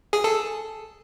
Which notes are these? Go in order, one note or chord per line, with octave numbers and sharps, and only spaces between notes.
G#4
A4